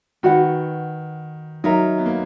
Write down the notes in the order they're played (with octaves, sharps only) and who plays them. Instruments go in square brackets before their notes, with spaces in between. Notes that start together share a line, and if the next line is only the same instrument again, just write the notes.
[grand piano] D#3 [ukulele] F#4 B4 F#5
[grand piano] F#3 [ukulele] D#4 A#4 E5 A#5
[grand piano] B3
A#3